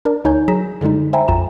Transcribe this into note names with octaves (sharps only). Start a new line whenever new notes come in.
D4 A#4 D5
D2 D#4 C#5 G#5 G6
F#3 G#4 A#5 A#6 B6 E7
F#2 D3 G3 G#3 D#4
C5 E5 G5 G#5 A#5 B5
A#1 F2 F4 A#5 E7